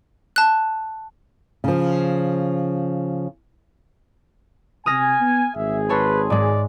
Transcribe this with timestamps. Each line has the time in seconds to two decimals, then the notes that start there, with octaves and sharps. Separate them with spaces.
0.36 A5 F#6
1.64 C#3 F3
4.86 C3 G#5 D#6 F6 A#6
5.20 B3
5.56 G#1 G#4 E5
5.89 A4 B4 C#5 C6
6.30 G#2 G#3 D5